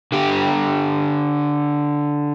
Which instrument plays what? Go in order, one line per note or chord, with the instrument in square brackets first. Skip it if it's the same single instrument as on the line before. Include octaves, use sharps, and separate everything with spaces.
[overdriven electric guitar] D3 G4